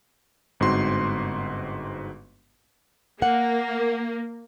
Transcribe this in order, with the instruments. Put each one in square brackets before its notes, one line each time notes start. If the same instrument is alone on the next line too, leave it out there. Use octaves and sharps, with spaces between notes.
[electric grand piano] G1 G#2 C4 F#4 C6
[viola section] A#3 [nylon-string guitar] F#5